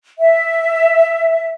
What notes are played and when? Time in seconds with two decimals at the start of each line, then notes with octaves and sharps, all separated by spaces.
0.19 E5